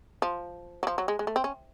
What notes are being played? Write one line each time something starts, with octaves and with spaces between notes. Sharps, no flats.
F3
F#3
F3
F#3
G#3
G#3
A3
C4
C#4